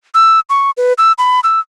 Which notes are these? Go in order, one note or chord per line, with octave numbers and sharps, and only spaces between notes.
E6
C#6
B4
E6
B5
E6